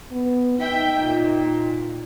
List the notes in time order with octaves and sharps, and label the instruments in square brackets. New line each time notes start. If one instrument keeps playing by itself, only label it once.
[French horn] B3
[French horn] D#4 [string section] E5 G5
[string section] A#2